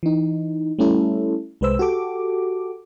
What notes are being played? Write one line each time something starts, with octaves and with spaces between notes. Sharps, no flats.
E3 D#4
G3 A3 C#4 E4 A4
C2 G#3 B4 C5 E6
F#4 G4 A4 D6